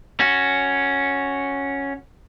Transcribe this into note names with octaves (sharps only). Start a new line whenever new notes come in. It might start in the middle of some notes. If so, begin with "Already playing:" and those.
C#4 F#4